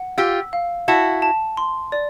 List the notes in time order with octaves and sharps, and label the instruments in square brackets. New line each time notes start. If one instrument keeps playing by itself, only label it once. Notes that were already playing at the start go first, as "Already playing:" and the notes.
Already playing: [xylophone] F#5
[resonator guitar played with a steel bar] F4 G4 [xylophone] E6
[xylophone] F5
[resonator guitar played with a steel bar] E4 F#4 [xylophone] A5
[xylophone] A5
C6
D5